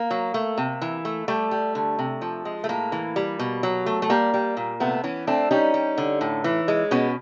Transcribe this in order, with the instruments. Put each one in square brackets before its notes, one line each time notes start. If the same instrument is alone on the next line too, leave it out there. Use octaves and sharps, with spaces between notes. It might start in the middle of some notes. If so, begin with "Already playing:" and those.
Already playing: [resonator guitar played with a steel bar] A#3
F#3
A3
C3
E3
A3
G3 A3
G3
D3
C3
F3
G#3
A3
A2 A#3
E3
G3
B2
F#3
A3
A3
G3 A#3
G3
A#2
C3 A3 B3
E3 B3 C#4
A3 C4 D4
G3 C#4 D#4
G3
D3
A2
E3
G#3
B2 B3 C#4